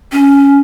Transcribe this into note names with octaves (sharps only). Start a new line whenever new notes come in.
C#4